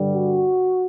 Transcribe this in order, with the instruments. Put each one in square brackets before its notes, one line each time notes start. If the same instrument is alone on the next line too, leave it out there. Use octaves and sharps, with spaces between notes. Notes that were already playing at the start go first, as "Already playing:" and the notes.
Already playing: [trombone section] G2 D3 G3
F#4